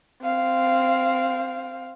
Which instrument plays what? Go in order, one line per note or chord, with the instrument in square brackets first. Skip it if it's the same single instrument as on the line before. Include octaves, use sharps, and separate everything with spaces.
[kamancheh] C4 F5